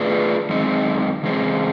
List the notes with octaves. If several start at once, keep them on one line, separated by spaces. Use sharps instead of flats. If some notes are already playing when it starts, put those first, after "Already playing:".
Already playing: A3 D4 F4 G#4 B4
F#2 D#3 G#3 C4 D#4
E2 C#3 G#3 C4